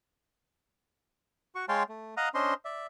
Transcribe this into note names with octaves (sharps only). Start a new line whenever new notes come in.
F#4 C#6
G#3 C#5 F5 G5 A5 C6
A3
D#5 F5 F#5 A#5 D#6
C#4 D4 C5 D#5 C6
D5 E5